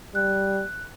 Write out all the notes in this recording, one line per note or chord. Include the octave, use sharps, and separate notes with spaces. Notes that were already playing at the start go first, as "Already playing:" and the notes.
G3 F#6